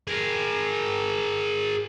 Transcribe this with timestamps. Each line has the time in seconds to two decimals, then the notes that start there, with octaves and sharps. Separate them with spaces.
0.08 G#4 A#4